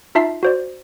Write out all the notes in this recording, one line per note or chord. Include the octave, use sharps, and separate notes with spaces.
D#4 F4 E5 A5 B6 C7
F#4 C5 D5